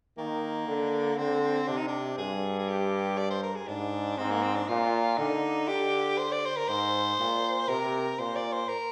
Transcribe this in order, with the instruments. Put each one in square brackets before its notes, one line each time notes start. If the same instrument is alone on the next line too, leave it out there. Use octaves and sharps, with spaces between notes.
[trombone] D#3 [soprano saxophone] A#3
[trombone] D3
[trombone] D3 [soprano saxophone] C4
[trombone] C3 [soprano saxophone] D4
[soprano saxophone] D#4
D4
[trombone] G2 [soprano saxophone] G#4
[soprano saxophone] G#4
G4
D5
C5
A#4
G#4
[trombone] G#2 [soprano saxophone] D4
[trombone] G#2 [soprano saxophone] C4
[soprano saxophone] A#3
C4
D4
[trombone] A#2 [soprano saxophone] F4
[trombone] D3 [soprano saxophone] D#4
[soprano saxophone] G4
C5
D5
C5
A#4
[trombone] G#2 [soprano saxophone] C5
[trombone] A#2
[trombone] C3 [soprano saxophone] A#4
[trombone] A#2 [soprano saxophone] C5
[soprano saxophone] D5
C5
A#4